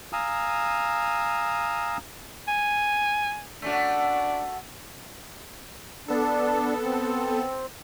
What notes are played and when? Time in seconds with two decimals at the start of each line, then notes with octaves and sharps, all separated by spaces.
0.13 F5 G#5 A#5 D#6 E6
2.48 G#5
3.62 A3 C#4 D4 F#4
6.08 B3 D4 A4
6.83 C4